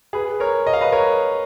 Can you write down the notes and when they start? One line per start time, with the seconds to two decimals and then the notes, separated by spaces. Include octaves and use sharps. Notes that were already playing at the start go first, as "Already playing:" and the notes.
0.13 G#4 B4
0.40 A#4 C#5
0.67 D#5
0.73 F5
0.81 B4 D#5
0.92 A#4 C#5